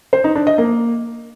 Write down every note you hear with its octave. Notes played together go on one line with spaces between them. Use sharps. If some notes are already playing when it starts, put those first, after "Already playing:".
C5
D#4
D4
D#5
A#3